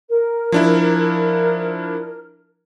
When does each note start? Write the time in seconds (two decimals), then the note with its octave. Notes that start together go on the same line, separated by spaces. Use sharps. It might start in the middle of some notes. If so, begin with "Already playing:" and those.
0.09 A#4
0.52 F3 D4 E4